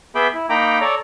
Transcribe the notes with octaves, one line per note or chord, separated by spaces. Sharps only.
B3 G#4 E5 B5 D6 G6
E4
A#3 D#4 G5 A#5 B5 D6
A4 C#5 D5 A#5